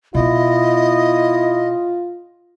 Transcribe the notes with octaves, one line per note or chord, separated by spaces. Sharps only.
B2 B3 E4 F4 D#5